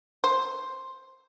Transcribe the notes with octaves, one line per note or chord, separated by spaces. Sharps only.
C5